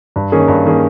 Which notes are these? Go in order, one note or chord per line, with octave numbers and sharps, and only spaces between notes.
G2
D#3 A#3 C#4 G#4
G2
D#3 A#3 C#4 G#4